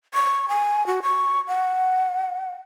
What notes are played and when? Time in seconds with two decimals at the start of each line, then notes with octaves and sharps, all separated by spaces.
0.14 C#6
0.48 G#5
0.87 F#4
1.03 C#6
1.48 F#5